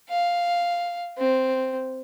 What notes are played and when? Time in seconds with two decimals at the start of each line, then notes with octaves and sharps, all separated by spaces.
0.10 F5
1.18 C4